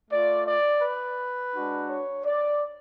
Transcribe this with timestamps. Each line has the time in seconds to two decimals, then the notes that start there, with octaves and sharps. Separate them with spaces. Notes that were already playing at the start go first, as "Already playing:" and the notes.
0.10 A3 F4 D5
0.46 D5
0.82 B4
1.54 G#3 D4 F#4
1.89 C#5
2.25 D5